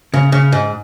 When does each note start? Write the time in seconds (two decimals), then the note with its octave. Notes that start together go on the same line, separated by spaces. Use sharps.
0.14 C#3
0.32 C#3
0.52 G#2